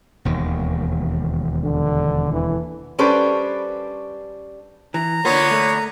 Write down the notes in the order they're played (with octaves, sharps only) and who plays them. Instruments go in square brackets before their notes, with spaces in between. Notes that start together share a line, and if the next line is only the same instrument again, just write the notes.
[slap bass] E1 D#2 D#3
[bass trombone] D3
E3
[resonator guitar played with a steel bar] G3 C#4 D4 A4 B4 C5
[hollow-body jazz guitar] E3 [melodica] A#5
[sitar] D3 B3 [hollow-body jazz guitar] A#3 F4 [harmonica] C#5
[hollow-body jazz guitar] A3